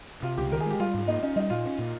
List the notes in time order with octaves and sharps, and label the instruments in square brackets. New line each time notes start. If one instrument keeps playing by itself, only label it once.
[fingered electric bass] C3 [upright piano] F4
[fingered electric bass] C#2 [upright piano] G4
[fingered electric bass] D#3 [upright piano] A#4
[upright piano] G#4
[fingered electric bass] G#3 [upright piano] G4
[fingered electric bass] G3 [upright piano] F4
[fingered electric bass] G#2
[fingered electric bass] A#3 [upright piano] D#4
[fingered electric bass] C#4 [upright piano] D#4
[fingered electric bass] G3 [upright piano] D#4
[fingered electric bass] A#2 [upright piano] F4
[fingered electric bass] C#4
A#2